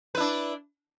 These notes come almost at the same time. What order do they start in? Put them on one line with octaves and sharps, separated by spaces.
B4 E4 D4